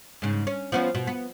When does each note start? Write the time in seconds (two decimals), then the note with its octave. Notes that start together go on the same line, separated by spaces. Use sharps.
0.22 G#2 C#3
0.47 C#4
0.72 F3 B3 C#4
0.95 B2
1.07 B3